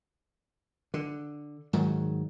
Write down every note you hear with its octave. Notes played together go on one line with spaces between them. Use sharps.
D3
G#2 D#3 F#3